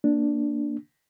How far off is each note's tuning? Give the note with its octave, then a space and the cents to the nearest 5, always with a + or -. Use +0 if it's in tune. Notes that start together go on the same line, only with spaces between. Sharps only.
A#3 +0 D4 +0